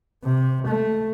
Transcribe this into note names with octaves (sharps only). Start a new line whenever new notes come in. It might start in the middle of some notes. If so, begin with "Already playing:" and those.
C3
A3